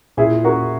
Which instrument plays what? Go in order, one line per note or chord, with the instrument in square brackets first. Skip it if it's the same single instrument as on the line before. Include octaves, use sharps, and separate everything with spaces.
[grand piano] A#2 [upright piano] E4 G#4
[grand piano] A#3 [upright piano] F#4 A#4